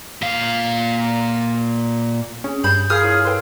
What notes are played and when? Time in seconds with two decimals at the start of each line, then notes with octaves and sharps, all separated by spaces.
0.22 A#2 F5
2.44 C#4 G#4
2.64 G2 B5 G6
2.90 F4 G#4 A#4 F5 D#6 F6
3.02 E4 A#4 C#5
3.24 A4 B4 G5 C6